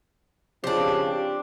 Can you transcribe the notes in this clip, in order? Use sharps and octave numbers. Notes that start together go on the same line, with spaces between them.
C#3 F3 C4 D4 G4